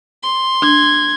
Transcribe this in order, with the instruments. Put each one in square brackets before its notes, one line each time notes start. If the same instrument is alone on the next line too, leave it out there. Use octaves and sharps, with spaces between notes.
[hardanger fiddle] C6
[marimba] D4 [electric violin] G#6